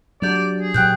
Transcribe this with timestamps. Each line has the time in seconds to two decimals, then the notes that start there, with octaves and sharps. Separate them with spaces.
0.22 F#3 D4 G4 D5 G6
0.60 G#4
0.74 A#2 F#3 G5 F#6 G6